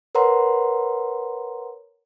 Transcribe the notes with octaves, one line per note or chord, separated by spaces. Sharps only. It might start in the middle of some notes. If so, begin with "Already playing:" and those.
A#4 B4 C#5 F#5 A#5 C6